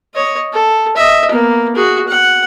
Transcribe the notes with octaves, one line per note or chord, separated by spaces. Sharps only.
C#5 D#5
A4
D#5 E5
A#3 B3
F#4 G#4
F#5